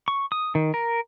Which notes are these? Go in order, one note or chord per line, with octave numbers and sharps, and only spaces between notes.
C#6
D#6
D#3
A#4